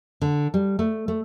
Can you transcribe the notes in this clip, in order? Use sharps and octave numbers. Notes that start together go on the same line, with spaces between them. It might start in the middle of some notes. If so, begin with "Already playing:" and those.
D3
G3
A3
A3